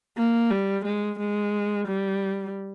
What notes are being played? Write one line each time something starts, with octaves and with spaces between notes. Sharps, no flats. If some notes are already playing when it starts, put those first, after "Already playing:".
A#3
G3
G#3
G#3
G3